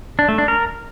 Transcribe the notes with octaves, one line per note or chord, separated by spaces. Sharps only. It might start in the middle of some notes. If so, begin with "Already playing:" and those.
D4
A3
D4
A#4